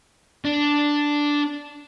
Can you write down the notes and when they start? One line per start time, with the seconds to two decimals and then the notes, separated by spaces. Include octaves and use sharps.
0.45 D4